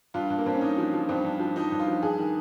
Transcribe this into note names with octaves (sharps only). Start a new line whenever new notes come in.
G2 F4
G2
A#3
G2 C4
C#4
G2 D#4
F3
F3
G2 C4
G2
F3
F3 D#4
G2
F4
F3
G2 G#4
D#3